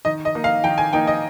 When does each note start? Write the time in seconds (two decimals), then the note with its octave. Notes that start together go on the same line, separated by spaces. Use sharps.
0.05 D#3 D#5
0.25 D#5
0.35 A#3 D#4
0.44 F5
0.64 D#3 G5
0.78 G#5
0.93 A#3 D#4 G5
1.07 D#5